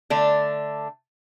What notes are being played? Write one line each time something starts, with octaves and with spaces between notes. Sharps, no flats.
D3 A3 D4